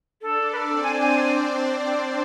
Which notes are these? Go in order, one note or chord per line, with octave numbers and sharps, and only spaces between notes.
D4 A4 D5
B4
A4
C4 C5
G#5
G#5